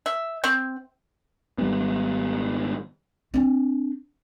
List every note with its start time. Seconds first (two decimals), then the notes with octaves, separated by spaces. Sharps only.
0.06 E5
0.44 C4
1.58 G#1 F#2 G3 B3
3.34 C4 D4